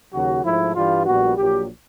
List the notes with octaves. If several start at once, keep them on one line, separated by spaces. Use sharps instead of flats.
D#2 C#3 F#3 F#4
G#2 F3 A3 E4
G2 E3 G3 F4
A#1 A#2 G3 B3 F#4
A#1 A#2 F#3 G4